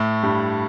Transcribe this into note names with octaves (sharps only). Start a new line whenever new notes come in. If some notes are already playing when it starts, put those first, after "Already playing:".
Already playing: A2 A3
G2 G3